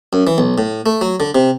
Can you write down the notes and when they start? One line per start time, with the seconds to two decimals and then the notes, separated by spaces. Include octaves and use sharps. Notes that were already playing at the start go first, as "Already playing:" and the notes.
0.13 F#2
0.27 E3
0.38 B1
0.58 A2
0.86 A3
1.01 F#3
1.20 D3
1.35 C3